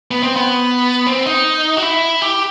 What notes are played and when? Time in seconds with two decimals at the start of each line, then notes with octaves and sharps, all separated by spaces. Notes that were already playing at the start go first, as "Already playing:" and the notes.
0.11 B3
0.23 C4
0.36 B3
1.07 C4
1.26 D#4
1.77 F#4
1.82 E4
2.22 G4